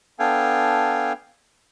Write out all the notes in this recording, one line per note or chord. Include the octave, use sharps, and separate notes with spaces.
B3 D4 A4 F5 G5 G#5